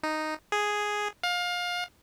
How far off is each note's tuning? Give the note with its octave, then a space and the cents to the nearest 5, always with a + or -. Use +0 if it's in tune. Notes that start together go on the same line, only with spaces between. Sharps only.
D#4 -5
G#4 +0
F5 +25